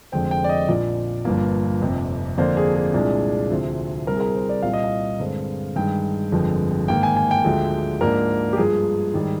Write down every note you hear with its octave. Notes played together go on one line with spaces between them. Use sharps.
F1 F2 D3 G#3 C4 G5
G5
D5
D#5
A#1 A#2 F3 D5
G1 G2 F3 A#3
F1 F2 C3
F2 D3 F3 A#3 D4 C5
G#4
G#4
C2 A#2 G#3 D4
D2 C3 F3 C4
C2 C3 G3 C4 A#4
G#4
A#4
C5
D5
C2 A#2 G3 F5
D#5
F5
G2 D3 G#3 C4
G2 D#3 G#3 G5
G1 F2 D3 F3 G#3
G#2 D#3 A#3 G5
G#5
G#5
G5
D2 D3 F3 G#3
G#2 F3 A#3 D4 A#4
G4
G2 F3 G#3 G#4
G#2 D#3 G3